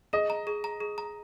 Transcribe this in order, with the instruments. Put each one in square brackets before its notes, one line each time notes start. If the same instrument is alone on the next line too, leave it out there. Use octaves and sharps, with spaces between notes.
[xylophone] G#4 [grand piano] D#5
[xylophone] A#5
G#4
A#5
G#4
A#5